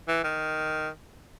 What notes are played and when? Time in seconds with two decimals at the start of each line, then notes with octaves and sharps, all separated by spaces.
0.08 E3
0.24 D#3